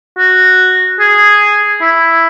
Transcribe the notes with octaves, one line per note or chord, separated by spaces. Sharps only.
F#4
G#4
E4